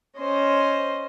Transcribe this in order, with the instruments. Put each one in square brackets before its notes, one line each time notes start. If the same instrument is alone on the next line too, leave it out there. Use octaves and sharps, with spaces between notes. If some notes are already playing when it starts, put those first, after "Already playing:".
[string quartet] C#4 C5 D#5